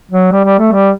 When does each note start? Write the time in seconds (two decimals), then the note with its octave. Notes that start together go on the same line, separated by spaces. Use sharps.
0.11 F#3
0.32 G3
0.45 G3
0.59 A3
0.72 G3